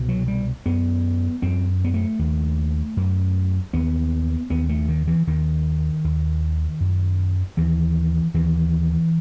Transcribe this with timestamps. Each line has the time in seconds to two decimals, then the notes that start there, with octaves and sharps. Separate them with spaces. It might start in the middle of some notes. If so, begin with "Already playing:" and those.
Already playing: C2 B2
0.09 F#3
0.28 G3
0.66 F#2 B3
1.42 F#2 C4
1.85 B3
1.94 A3
2.19 D#2
2.97 F#2
3.73 D#2 B3
4.50 D#2 B3
4.69 A3
4.89 D#3
5.07 E3
5.27 D#2 D#3
6.04 D#2
6.80 F#2
7.57 D#2 E3
8.34 D#2 E3